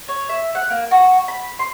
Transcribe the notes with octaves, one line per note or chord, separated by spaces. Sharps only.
C#5
E5
F#5
A#3
F#4
B5
C6